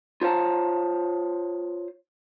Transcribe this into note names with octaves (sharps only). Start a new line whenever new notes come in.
F4 C5 C#5 D#5 A5 A#5